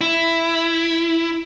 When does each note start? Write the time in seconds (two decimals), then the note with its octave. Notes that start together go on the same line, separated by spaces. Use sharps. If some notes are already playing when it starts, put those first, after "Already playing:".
0.01 E4